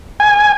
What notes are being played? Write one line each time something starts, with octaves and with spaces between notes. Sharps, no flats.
G#5